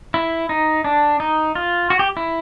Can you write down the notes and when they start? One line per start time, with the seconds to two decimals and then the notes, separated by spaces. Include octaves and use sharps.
0.14 E4
0.49 D#4
0.84 D4
1.20 D#4
1.55 F4
1.90 F#4
1.99 G4
2.17 E4